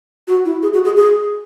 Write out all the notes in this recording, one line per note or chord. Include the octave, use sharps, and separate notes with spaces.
F#4
E4
G#4
F#4
G#4
G#4